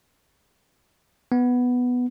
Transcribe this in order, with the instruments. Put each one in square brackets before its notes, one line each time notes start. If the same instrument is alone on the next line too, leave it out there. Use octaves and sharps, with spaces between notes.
[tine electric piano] B3